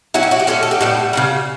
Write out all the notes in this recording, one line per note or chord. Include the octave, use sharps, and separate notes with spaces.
F#3 C#4 E4 F#4
G4
F#4
G4
D3 A3 C#4 F#4 A4
A4
G4
A2 G3 B3 F#4
C#3 E3 G3